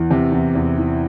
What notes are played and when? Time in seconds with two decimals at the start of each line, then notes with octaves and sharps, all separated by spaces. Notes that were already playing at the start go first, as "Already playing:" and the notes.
Already playing: E2 E3
0.11 C3
0.32 E2
0.55 E2
0.78 E3